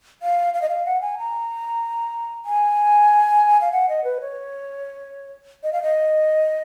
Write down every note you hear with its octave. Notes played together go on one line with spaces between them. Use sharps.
F5
F5
D#5
F5
F#5
G#5
A#5
G#5
F5
F#5
D#5
B4
C#5
D#5
F5
D#5